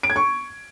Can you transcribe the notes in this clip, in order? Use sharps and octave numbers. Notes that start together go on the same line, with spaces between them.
D7
G#6
C#6